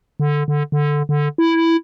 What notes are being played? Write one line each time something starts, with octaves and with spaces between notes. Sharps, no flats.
D3
D3
D3
D3
E4